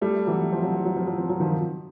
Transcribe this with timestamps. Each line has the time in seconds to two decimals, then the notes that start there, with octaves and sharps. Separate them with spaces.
0.01 G3 A3
0.27 E3 F#3
0.53 F3
0.63 F#3
0.75 F3
0.85 F#3
0.97 F3
1.07 F#3
1.18 F3
1.30 F#3
1.40 D#3 F3